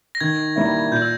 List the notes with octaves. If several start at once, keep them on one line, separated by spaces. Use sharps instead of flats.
A#6
D#3 G#6
G3 A#3 E4
A#2 G6
E6